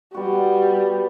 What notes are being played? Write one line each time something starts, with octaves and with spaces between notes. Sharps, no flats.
G3 B3 F#4